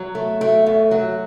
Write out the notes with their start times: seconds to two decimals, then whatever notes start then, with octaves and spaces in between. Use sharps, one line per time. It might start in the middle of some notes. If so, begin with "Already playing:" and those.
Already playing: F#3
0.15 A3
0.41 A3
0.66 F#2
0.91 F#3